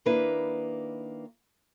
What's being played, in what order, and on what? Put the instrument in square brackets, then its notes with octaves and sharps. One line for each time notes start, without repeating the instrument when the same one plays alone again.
[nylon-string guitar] D#3 A#3 D4 E4 B4